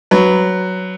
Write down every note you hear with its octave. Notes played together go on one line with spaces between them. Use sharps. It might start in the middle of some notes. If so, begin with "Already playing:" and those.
F#3 B4